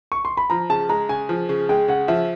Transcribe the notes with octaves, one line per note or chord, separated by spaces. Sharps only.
C#6
C6
B5
F3 A#5
C#3 A5
G#3 A#5
C#3 G#5
F3
C#3
G#3 G5
C#3 F#5
F3 E5